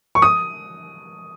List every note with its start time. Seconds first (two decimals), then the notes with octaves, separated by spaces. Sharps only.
0.15 C#6
0.22 D#6